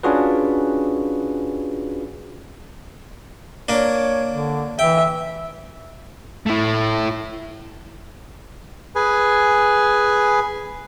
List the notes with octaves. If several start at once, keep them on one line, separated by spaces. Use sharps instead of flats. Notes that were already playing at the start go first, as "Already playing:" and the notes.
C#4 D4 F4 F#4 G#4 B4
A#3 D4 C#5
D3
E3 E5 G5
A3 E4
G#4 B4 G#5